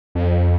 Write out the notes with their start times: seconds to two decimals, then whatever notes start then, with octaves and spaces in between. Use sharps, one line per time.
0.15 F2